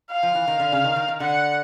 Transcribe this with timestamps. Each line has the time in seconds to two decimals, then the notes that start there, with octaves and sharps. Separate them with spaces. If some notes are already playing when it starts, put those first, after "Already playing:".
0.11 F5
0.23 F3
0.35 E3
0.48 D#3
0.60 D3
0.72 C#3
0.84 D#3
0.96 D#3
1.08 D#3
1.20 D3 F#5